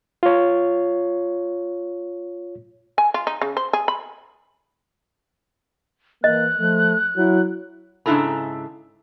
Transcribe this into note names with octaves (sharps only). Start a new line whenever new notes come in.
F4 C#5
G#5
F4
D#4
C#3
C5
G#4
B5
E3 A#3 D#5 F#6
F3 A3
F#3 E4
G#2 C#3 D4 E4 A4 A#5